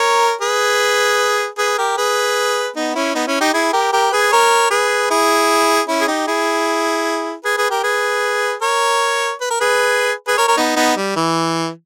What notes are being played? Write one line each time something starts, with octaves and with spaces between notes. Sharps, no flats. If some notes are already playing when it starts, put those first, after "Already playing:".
Already playing: A#4 C#5
G#4 B4
G#4 B4
G4 A#4
G#4 B4
B3 D#4
C#4 E4
B3 D#4
C#4 E4
D#4 G4
E4 G#4
G4 A#4
G4 A#4
G#4 B4
A#4 C#5
G#4 B4
E4 G#4
C#4 E4
G#4
D#4 G4
E4 G#4
G#4 B4
G#4 B4
G4 A#4
G#4 B4
A#4 C#5
B4
A#4
G#4 B4
G#4 B4
A#4 C#5
A#4 C#5
B3 D#4
B3 D#4
G3
E3